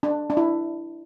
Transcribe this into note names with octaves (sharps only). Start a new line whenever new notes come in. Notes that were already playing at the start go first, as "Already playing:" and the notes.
D4
D4
E4